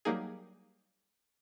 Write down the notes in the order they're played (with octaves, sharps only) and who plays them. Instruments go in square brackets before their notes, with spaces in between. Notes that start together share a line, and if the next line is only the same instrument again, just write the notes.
[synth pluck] F#3 G3 A#3 D#4 G#4